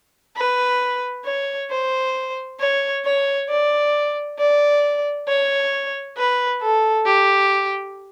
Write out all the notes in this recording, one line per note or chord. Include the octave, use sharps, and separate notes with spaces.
B4
C#5
C5
C#5
C#5
D5
D5
C#5
B4
A4
G4